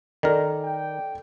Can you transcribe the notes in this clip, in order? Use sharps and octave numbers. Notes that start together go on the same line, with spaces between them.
D#3 A4 A#4 D5
G5